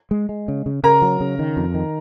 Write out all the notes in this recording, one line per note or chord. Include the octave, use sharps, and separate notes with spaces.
G#3
G#3
C#3
C#3
C#3 A#4 A#5
F#3
C#3
D#3
F2
D#3